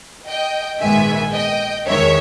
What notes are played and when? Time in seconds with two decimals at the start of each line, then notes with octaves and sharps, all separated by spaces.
0.26 D#5 G5
0.80 A#1 G#2 D#3 G#3 B3 E5 G#5
1.33 D#5 G5
1.87 E2 D#3 G#3 C#5 E5